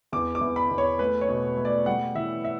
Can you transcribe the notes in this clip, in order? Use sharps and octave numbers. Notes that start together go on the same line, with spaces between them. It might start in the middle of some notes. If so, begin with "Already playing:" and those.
E2 D6
D6
E2
B5
E2
C#5
A3 B4
C#5
B2
A3
D5
G3 F#5
E3 E5
E5